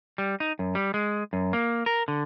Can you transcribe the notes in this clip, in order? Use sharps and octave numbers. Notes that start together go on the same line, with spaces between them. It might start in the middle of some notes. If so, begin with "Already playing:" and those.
G3
D#4
F#2
G3
G#3
F#2
A#3
A#4
D3